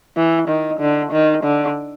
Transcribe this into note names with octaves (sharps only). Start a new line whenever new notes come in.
E3
D#3
D3
D#3
D3